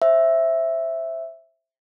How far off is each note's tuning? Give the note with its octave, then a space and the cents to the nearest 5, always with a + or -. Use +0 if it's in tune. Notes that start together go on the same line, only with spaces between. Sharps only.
C5 +30 E5 +0